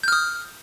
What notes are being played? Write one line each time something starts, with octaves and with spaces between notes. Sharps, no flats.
D#6 F6 G6